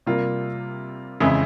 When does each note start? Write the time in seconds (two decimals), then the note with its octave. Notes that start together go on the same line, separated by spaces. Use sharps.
0.06 C3 G3 A#3 F4 A#4
1.20 F2 C#3 E3 G#3 E4